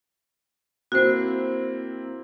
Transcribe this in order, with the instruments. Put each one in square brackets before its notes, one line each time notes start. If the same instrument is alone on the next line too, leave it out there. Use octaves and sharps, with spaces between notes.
[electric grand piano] A#3 C4 E4 [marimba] F#4 C5